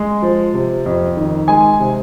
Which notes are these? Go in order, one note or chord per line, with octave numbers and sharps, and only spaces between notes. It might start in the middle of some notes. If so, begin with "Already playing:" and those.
Already playing: G#3
F3
C3
F2
D#3
G#3 G#5
C3